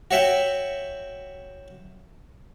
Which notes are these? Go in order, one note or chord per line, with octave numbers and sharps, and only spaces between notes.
F#4 C#5 E5 G5